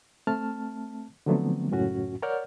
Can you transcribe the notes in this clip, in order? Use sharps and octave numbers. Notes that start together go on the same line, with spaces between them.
A3 C4 A5 F6
D3 F3 F#3 A3 B3 C4
C#2 F#2 A2 C#4 F#4
A#4 C#5 D5 F#5 F6 G6